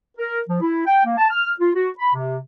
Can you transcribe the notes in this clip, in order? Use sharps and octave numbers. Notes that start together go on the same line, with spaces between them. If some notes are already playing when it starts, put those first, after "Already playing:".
A#4
F3
E4
G5
A#3
A5
F6
F4
F#4
B5
C3